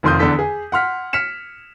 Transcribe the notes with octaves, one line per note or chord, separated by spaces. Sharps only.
F1 F2 D#3 C6 D#6 G6
E2 D3 D4 A4 B6
G#4
F#5 C6 F6 B6
F6 B6 C#7 E7